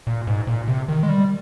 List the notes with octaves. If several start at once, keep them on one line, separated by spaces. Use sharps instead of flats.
A#2
G#2
A#2
C3
D#3
G#3
G3